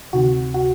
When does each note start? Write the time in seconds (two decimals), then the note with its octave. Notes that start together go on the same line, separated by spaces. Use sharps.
0.13 D2 C3 D#3 F#4
0.54 F#4